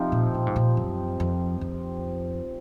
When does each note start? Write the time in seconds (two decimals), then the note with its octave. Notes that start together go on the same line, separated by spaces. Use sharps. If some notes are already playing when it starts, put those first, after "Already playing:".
Already playing: C3 F3 C4 D#4
0.12 A#2
0.34 A#2
0.47 G#2
0.56 A#2
0.77 F#2
1.20 F2
1.61 F2